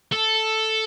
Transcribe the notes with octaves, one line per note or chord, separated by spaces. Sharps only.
A4